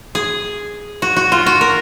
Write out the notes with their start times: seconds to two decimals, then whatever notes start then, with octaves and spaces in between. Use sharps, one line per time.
0.15 G#4
1.02 F#4
1.16 F#4
1.32 F4
1.46 F#4
1.61 A#4